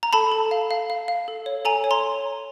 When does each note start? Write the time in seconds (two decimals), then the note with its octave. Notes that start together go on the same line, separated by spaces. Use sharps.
0.03 A#5
0.13 A4 A5 B5
0.32 A4
0.51 F5
0.71 F5
0.90 F5
1.08 F5
1.28 A4
1.46 C#5
1.65 A4 G#5 A#5
1.84 C#5
1.91 A#5 C6